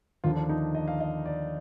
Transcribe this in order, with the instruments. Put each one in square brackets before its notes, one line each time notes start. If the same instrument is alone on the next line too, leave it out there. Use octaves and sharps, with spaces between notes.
[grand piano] D#2 D3 F3 F4
D4
D#4
D#5
F5
D#5
D5